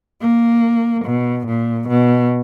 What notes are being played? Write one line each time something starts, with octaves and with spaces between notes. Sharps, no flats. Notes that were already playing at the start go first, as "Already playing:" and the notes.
A#3
B2
A#2
B2